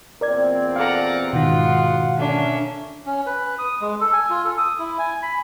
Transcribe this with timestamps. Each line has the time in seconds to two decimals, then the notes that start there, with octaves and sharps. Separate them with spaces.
0.21 E2 A#2 C4 A#4 D5 G#6
0.76 A4 D5 F5 F#5 A#5
1.33 G#2 B2 D#3 F4 F#4 F5 F#5
2.17 D3 A#3 C#4 D4 E5
3.06 C#4
3.26 B4
3.59 D#6
3.81 G#3
4.01 A4
4.13 G#5
4.30 F4
4.45 A4
4.58 D#6
4.79 E4
4.99 G#5
5.22 B5